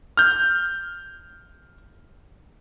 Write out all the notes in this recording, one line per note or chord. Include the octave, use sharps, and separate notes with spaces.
F6 G6